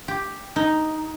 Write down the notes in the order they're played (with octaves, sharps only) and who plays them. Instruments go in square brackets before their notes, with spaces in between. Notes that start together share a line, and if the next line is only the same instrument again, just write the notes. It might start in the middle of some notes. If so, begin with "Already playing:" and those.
[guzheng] G4
D#4